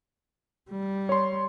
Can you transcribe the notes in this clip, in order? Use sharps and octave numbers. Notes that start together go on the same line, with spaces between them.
G3
C#5 C6